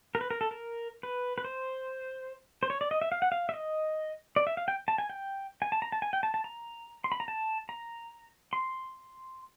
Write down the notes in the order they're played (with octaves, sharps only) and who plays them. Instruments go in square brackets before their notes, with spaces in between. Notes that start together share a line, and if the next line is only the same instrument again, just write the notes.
[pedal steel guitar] A#4
B4
A#4
A4
A#4
B4
B4
C5
C5
C#5
D5
D#5
E5
F5
F#5
F5
E5
D#5
D5
E5
F5
G5
A5
G#5
G5
G#5
A5
A#5
A5
G#5
G5
A5
A5
A#5
C6
B5
A#5
A5
A#5
C6